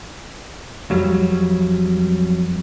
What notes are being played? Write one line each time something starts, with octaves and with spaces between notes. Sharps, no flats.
F2 F#3 G3